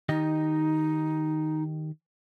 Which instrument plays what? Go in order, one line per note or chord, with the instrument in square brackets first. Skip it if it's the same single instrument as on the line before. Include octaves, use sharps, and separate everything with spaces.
[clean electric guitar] D#3 G4 D#5 [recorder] D#4